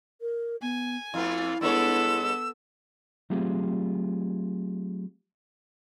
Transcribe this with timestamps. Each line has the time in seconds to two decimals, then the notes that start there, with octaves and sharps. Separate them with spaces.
0.21 A#4
0.62 B3 G#5
1.14 F2 A3 B3 E4 F5
1.61 G2 G#3 B3 A4 C#5 E6
3.30 F#3 A3 C4 F4 G4 G#4